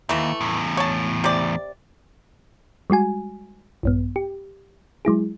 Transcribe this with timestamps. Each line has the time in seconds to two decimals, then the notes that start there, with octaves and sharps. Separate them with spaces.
0.09 D#2 E3 A3
0.41 E2 A2
0.77 C#5 A5
1.24 C3 D5
2.90 G3 G#3 F#4 G#5
3.83 A#1 G2 B3
4.16 G4
5.05 F#3 G#3 E4 G#4